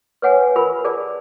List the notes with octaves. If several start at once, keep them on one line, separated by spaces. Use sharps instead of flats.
B4 C#5 F#5 G#5
F4 A#4 B5
G#4 D5 A5